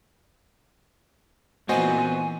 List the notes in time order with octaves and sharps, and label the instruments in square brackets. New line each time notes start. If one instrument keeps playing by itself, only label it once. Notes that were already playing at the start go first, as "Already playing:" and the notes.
[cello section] A#2 E3 [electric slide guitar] B3 C4 [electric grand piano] F#4 C5 D#5 [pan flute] G#5